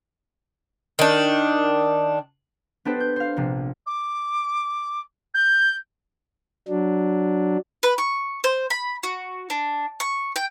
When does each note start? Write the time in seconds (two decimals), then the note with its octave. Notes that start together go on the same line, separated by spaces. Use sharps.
0.99 D#3 D4
2.85 B3 D4 G4 A4 B4 C5
3.00 G6
3.16 C5 F5
3.37 A#1 C3
3.86 D6
5.34 G6
6.68 F#3 D4
7.83 B4
7.98 C#6
8.44 C5
8.70 B5
9.03 F#4
9.50 D4
10.00 C#6
10.36 G5